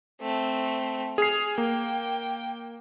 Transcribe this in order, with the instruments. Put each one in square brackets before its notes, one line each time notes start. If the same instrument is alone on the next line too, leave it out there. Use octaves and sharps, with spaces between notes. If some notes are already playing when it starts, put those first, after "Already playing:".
[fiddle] A3 C4
[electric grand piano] G#4 C7 [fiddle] F6
[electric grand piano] A#3 [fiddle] G5